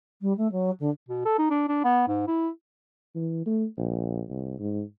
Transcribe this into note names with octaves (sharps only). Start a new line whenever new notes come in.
G3
A3
F#3
D3
B2
A4
D#4
D4
D4
B3
G#2
E4
E3
A3
A#1
C2
G#2